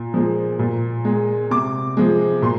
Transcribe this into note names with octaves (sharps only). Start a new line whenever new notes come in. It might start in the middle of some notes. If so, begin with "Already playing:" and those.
Already playing: A#2
F3 G#3
A#2
G#3
C3 D6
F3 G#3
A#2 C6